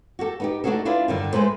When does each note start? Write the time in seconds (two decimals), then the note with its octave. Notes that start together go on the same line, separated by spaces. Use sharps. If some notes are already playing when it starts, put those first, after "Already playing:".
0.19 F#4 G4 A4
0.40 B3 D#4 G4
0.64 A3 D4 D#4 F#4 G#4 A4
0.85 D4 E4 F4 B4 D5
1.08 G2 D3 D#3
1.33 G#3 A3 B4 C5